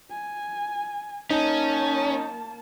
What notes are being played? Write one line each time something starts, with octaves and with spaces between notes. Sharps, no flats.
G#5
A#3 C#4 D#4 A5